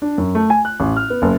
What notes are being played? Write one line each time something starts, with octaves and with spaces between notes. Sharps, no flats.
D4
F#2
A3
G#5
F#6
A1
F6
B3
F#1